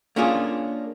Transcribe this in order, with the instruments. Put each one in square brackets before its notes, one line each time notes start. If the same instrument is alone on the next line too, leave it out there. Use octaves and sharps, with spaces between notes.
[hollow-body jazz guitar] A#3 C#4 D4 F4 G#4